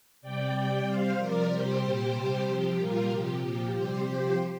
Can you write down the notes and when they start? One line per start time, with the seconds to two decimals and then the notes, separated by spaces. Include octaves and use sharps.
0.22 C3 G3 D5 G5
0.53 C3 G3
0.85 C3 G3 C5 F5
1.17 C3 F3 A#4 D5
1.49 C3 G3 G4 C5
1.81 A#2 G3
2.13 C3 G3
2.45 C3 F3 G4
2.77 A#2 G3 F4 A#4
3.09 C3 F3 G4
3.41 A#2 F3 G4
3.73 C3 G3 G4 C5
4.04 C3 F3 G4 C5